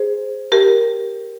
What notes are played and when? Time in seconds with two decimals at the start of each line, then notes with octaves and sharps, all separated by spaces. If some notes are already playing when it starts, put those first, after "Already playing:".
Already playing: G#4 C5
0.52 G4 A#4